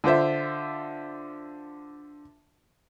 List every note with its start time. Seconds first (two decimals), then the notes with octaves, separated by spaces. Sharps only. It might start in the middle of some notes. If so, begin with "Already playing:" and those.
0.04 D3 F4 C5 E5